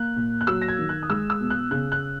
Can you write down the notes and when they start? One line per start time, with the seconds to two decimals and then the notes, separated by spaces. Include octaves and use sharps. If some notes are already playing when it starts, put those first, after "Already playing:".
Already playing: A#3 F#6
0.16 A#2
0.41 F#6
0.47 F#3 E6
0.62 A#6
0.68 G#6
0.79 D#3
0.89 F#6
1.03 D#6
1.10 G#3 E6
1.30 E6
1.40 B2
1.50 F#6
1.71 C#3 F#6
1.92 F#6